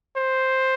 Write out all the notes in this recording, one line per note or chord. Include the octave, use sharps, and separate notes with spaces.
C5